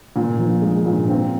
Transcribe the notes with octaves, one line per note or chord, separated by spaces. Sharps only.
A#2
F3
G#3
A#2
C4